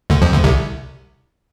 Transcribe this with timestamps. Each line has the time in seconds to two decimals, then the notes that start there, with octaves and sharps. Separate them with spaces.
0.10 D2 D3
0.22 F2 F3
0.33 D2 D3
0.44 C2 C3